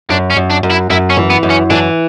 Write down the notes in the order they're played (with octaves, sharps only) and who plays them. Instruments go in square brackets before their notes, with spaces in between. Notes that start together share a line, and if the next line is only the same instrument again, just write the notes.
[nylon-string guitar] F#2 [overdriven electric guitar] D4
[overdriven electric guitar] C#4
[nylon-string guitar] F#2
[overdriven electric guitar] D4
[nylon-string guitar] F#2
[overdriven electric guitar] E4
[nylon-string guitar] F#2 [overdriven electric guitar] E4
[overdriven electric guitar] C#4
[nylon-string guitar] E3
[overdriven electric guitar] B3
[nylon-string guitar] F#2
[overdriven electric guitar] C#4
[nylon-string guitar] E3 [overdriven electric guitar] D4